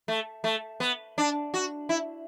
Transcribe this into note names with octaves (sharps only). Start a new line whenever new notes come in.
A3
A3
B3
D4
F#4
E4